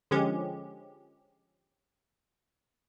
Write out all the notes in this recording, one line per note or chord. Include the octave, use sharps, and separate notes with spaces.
D3 F3 G#3 C#4 G4